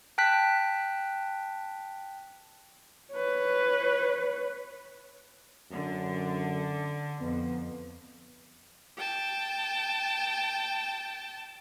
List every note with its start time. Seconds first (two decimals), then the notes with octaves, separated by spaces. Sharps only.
0.18 G5 A5 F#6 B6
3.12 B4 C#5
5.71 F#2 D3
7.21 F2 B3
8.97 G5 A5